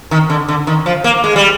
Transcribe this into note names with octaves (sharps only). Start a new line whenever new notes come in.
D#3
D3
D3
D#3
F3
A#3
G#3
G3